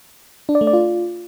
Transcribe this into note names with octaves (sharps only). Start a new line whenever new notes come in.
D4
D5
A3
D5
F4